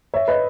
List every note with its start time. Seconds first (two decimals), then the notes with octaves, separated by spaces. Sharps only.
0.14 C#5 E5
0.28 B4 D#5